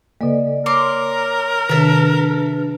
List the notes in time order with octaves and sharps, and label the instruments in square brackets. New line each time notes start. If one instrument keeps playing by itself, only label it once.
[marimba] C#3 A#3 [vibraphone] A4 D5 D#5
[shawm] A#4 [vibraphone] C#5 [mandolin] C6 D6
[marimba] C3 D#3 [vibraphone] D4 G#4 B4 [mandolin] A4 E5